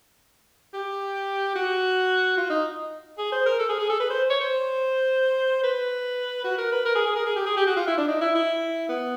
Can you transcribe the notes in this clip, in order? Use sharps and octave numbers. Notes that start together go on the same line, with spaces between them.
G4
F#4
F4
D#4
G#4
C5
A#4
A4
G#4
G#4
A4
B4
C5
C#5
C5
B4
F#4
A#4
B4
A#4
G#4
G#4
A#4
G#4
G4
G#4
G4
F#4
F4
E4
D4
D#4
E4
E4
B3